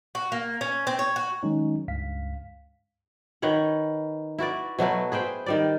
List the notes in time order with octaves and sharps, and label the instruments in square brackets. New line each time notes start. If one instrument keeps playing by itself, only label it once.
[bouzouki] F#4
A#3
C#4
C4
C#5
F#4
[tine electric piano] D#3 F#3 G#3 C#4 D#4
C#2 G2 F5 B6
[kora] D#3 B4 C#5 F#5
E4 F#4 B4 D5
B2 F#3 A3 B4
G#4 B4 C5 G5
D#3 G3 D5